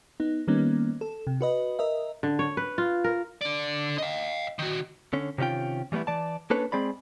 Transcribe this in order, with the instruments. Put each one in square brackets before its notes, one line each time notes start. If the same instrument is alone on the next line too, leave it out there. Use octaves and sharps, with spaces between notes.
[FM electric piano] B3 D#4
D#3 G3 A#3 B3 C#4 D#4
A4
C3
F#4 B4 D#5
A#4 D#5 E5
[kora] D3
C#5
B4
F4
A#4
[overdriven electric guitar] D3 D5
D#5 F5
D#3 F#4
[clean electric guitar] D3 C#4
C3 D#3 C#4 F4 G5
E3 G3 A3 B3 E4
E3 D5 A5
A#3 C#4 D4 A4 B4 C#5
G#3 C4 G#4 D5 B5